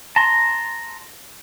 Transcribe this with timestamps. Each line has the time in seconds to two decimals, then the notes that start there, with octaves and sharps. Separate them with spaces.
0.16 A5 A#5 C6